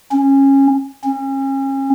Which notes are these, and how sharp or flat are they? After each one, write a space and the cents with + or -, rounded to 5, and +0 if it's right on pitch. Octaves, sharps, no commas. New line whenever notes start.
C#4 -20
C#4 -35